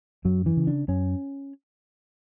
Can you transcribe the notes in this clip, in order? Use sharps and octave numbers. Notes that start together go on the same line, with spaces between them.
F#2 F#3
E3
C#3
D4
F#2 C#4